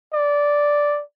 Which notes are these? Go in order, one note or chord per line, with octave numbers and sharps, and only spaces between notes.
D5